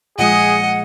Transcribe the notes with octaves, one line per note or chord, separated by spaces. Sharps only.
A#2 F3 G#3 G#4 D#5 F#5